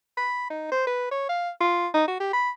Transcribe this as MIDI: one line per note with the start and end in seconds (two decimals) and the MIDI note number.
0.17 0.49 83
0.50 0.69 63
0.72 0.85 72
0.87 1.08 71
1.11 1.25 73
1.29 1.50 77
1.60 1.88 65
1.94 2.08 63
2.08 2.17 66
2.20 2.31 67
2.33 2.50 83